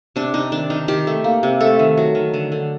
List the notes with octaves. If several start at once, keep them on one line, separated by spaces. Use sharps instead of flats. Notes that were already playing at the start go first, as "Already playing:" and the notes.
C3 D4
C3 D#4
D#3 D4
D#3 D#4
D#3 G4
A3
A#3
C3
A3 A4
D#3
F#3
D#3
D3
D3